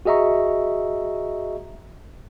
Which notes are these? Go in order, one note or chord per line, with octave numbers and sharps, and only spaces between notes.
F#4 G#4 D#5 E5 A#5 C#6